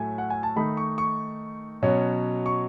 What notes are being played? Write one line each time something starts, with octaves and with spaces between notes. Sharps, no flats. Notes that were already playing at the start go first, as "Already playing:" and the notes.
Already playing: A2 F#3 A3 G#5
F#5
G#5
A5
D#3 A3 D#4 B5
C#6
C#6
B2 F#3 C#4
C#6